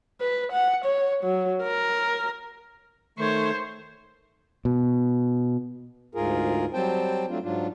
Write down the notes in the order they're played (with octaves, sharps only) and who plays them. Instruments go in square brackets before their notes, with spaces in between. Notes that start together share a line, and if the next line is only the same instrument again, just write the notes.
[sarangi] B4
F#5
C#5
F#3
A#4
[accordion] D#3 A3 [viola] C5 C#5
[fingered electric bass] B2
[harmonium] D2 G#2 F4 G#4 A#4
F#3 G3 C4 C5 G5 A5
F#3 A3 C4 D4 F4
G#2 F#3 D4 F4